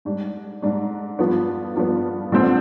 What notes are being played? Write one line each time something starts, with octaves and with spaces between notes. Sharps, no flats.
G#2 G3 D4
G#2 G3 D4
G2 F3 B3
G2 F3 B3
D3 F3 G#3 C4